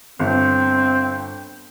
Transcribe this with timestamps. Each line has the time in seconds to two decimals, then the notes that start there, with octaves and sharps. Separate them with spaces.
0.20 G1 C4